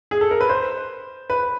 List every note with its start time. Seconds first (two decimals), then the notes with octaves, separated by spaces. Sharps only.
0.11 G#4
0.21 A4
0.31 A#4
0.41 B4
0.49 C5
1.30 B4